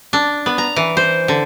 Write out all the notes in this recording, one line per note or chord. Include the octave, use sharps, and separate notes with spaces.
D4
B3
A#5
E3
C5
D3